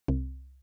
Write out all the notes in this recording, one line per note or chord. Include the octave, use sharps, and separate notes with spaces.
C2